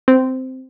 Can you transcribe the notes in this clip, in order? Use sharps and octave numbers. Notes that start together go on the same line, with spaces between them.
C4